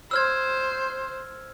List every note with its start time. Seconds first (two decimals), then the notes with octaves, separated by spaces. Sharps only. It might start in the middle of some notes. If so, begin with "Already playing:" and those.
0.11 C5 E6 F6 G#6